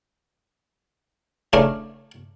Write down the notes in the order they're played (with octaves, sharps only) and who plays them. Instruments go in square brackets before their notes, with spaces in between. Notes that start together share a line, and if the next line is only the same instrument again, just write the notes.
[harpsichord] C#3 A3 D4 A#4